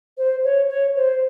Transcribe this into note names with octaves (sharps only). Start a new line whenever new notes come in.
C5
C#5
C#5
C5